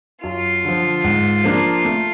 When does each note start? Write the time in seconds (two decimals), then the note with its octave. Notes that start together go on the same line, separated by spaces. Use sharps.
0.23 F#2 F4
0.65 D3 F3
1.04 G#2
1.44 F3 A#3 D4
1.85 A3